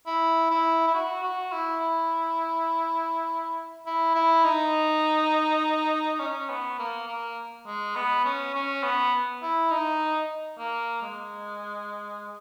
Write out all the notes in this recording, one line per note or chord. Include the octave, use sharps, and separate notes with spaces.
E4
E4
E4
F#4
F#4
E4
E4
E4
D#4
C#4
B3
A#3
A#3
G#3
B3
C#4
C#4
B3
E4
D#4
A#3
G#3